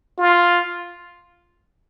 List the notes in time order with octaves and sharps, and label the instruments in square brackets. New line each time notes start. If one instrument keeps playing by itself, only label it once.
[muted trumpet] F4